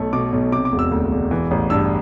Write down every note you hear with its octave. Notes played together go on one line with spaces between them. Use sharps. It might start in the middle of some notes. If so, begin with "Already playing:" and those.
Already playing: B1 A3
B2 D6
B1
C3 D6
D6
E1
E6
D2
E1
E3
A1
G2 E6